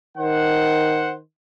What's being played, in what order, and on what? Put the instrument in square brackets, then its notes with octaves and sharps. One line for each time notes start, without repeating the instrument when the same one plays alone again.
[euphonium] D#3 [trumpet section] C5 F#5